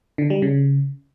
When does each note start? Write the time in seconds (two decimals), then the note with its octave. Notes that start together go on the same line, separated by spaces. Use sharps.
0.18 D3
0.30 G3
0.42 C#3